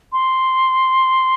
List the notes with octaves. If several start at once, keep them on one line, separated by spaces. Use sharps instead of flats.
C6